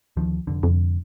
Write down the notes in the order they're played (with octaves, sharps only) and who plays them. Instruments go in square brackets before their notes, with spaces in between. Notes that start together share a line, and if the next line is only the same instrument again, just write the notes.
[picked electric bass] D2 D#3 F3
F1 D3
[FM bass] F2